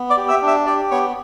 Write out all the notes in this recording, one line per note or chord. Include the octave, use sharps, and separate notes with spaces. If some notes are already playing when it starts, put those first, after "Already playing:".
Already playing: B3
D5 D6
G4
E5 E6
D4
E5 E6
G4 D5 D6
B3 C#5 C#6